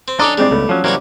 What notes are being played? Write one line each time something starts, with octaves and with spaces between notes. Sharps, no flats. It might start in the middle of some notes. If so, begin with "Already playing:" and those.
C4
C#4 D4 A4 D#5 A#5 D6 D#6
G3 G#3 C4 D5
C#2 A3 B3
F3 F#3 C#4
C3 E3 F#3 G3 A#3 F#4